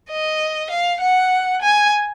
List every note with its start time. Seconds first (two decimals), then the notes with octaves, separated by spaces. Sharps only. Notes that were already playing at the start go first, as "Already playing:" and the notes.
0.10 D#5
0.70 F5
1.00 F#5
1.62 G#5